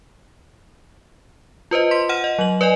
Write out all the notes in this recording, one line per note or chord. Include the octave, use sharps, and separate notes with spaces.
F4 B4 C5 D#5
C6 B6
F#5 F6 D#7 E7
D#5
F#3 F#7
B4 D5 D#5 G#5